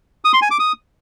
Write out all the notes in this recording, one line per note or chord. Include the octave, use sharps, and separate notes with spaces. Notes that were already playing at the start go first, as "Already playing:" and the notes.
D#6
C6
G#5
D6
D#6